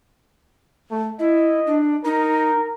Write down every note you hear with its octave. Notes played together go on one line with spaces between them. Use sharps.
A3
E4 D#5
D4
D#4 A#4